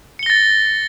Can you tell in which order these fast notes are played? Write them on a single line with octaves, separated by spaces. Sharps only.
C#7 G7 A#6 A6